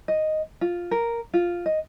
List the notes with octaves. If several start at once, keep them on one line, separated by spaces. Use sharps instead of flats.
D#5
F4
A#4
F4
D#5